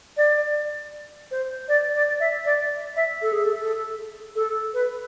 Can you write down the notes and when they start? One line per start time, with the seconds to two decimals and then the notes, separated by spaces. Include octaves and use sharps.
0.17 D5
1.31 C5
1.68 D5
1.95 D5
2.20 E5
2.45 D5
2.96 E5
3.22 A4
3.32 G#4
3.44 A4
3.60 A4
4.35 A4
4.74 B4